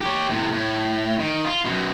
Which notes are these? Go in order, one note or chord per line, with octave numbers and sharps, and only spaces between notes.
G4 C#5
A2 C3
A2
D#3
F4
F#2 B2